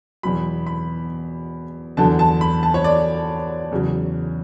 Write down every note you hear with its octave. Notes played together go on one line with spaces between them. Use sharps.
E2 B2 F#3 B5
B5
E2 D3 F#3 A5
A5
B5
A5
C#5
D5
E2 C#3 F#3